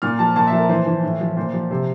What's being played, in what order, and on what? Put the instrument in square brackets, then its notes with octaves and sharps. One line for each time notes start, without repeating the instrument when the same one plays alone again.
[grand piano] A#2 F6
F3 A5
A#2 A5
F3 E5
A#4
E3 C5
E3
A2
F3
A#2 C5
F3
C3 C5